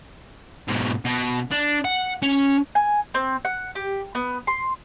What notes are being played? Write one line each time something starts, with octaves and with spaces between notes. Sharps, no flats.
G#2 B2
B2
D4
F#5
C#4
G#5
C4
F#5
G4
B3
C6